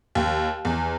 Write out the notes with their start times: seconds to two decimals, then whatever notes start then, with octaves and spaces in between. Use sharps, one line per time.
0.15 D#2
0.65 E2